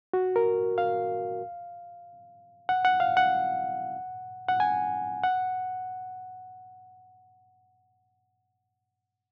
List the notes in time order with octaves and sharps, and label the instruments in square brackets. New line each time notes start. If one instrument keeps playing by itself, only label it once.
[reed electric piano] F#4
A#4
F5
F#5
F#5
F5
F#5
F#5
G#5
F#5